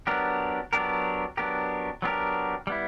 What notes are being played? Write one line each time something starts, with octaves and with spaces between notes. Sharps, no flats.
F#3 B3 D4 G4 A#4
F#3 B3 D4 G4 A#4
F#3 B3 D4 G4 A#4
F#3 B3 D4 G4 A#4
G3 B3 E4